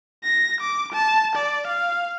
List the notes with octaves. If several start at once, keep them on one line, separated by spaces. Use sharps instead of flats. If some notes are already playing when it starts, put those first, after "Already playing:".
A#6
D6
A5
D5
F5